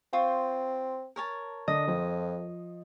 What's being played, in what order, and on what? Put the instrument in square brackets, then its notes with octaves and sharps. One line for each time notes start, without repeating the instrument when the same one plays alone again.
[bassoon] C4 [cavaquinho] F4 C5 C#6
[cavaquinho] A#4 C#5 A5
[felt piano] D3 [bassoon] D4 [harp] D#5
[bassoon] F2 [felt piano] F3